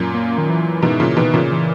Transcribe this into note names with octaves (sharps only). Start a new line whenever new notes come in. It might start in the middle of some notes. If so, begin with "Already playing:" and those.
Already playing: F#2 A#2
A#3
D#3
E3
G#2 B2
A#2 C#3
B2 D#3
A#2 C#3
E3